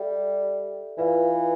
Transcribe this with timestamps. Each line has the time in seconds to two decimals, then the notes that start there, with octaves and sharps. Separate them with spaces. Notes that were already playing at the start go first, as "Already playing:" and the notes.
Already playing: G3 A4 E5 G5
0.98 E3 F4 B4 D5 F5